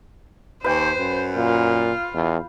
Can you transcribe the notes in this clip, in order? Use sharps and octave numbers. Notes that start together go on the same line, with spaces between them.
D#2 B4 C5 G5
F#2
A#2 F4
E2